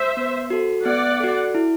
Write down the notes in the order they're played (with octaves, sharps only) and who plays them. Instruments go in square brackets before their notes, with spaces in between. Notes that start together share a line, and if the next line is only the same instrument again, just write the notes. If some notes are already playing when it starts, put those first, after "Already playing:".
Already playing: [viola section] C5 E5
[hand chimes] B3
F#4 A4
[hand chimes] B3 [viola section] D5 F#5
[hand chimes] F#4 A4
E4